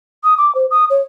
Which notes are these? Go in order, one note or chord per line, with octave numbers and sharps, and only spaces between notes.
D#6
D6
C5
D#6
C#5